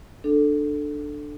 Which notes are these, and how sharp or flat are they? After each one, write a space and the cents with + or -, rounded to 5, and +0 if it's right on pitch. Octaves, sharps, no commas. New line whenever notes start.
D4 +15 A4 +0